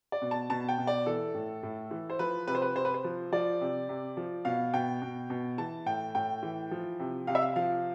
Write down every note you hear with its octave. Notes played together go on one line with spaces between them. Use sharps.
D5
B2
A5
B2 A5
G5
B2
D5
E3 A4
A2
A2
E3
C5
F3 B4
C3 B4
C5
B4
C3 C5
B4
C5
F3
F3 D5
C3
C3
F3
B2 F5
B2 G5
B2
B2
E3 A5
A2 G5
A2 G5
E3
F3
C3
C3 F5
E5
F5
F3 F5